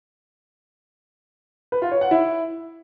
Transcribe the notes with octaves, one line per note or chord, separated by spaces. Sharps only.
B4
F4
C#5
F#5
E4